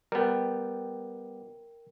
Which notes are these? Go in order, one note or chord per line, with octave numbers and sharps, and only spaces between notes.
G3 B3 A#4 G5